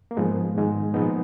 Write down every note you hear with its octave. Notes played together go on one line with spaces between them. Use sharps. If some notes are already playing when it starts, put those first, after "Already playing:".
A#3
G#2 F3 G#3 B3
G#2 D#3 G#3
A#2 F3 G#3 B3 D#4